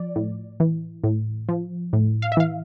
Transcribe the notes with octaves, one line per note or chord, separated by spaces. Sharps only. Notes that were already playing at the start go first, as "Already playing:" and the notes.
Already playing: F3 D5
A2
E3
A2
F3
A2
F5
E5
E3 F5